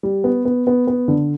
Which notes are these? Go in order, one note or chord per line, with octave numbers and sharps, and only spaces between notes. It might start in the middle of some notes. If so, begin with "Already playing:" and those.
G3
B3
B3
B3
B3
D3